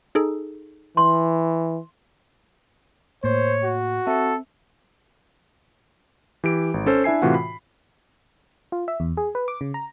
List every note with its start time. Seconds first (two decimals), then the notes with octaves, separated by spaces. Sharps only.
0.15 D#4 G#4 A4
0.97 E3 C6
3.24 A2 A#3 C5 C#5
3.64 F#4
4.07 C4 A4 E5
6.44 E3 G4 D7
6.74 G#1
6.86 C#4 A4 C5
7.04 D4 E4 E5 G#5 C7
7.22 A2 C3 E3 F4 F#4 F#5
7.34 B5
8.72 F4
8.88 E5
9.00 E2
9.17 G#4
9.35 B4
9.48 D6
9.61 C#3
9.74 A#5